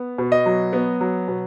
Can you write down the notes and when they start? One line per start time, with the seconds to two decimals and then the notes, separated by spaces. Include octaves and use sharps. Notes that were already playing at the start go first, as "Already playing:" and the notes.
Already playing: B3
0.18 B2
0.32 D#5
0.46 F#3
0.73 B3
1.01 F#3
1.28 B2